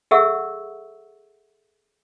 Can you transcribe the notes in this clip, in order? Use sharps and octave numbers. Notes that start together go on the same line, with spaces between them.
G#4 A4 E5 F#5 C#6 E6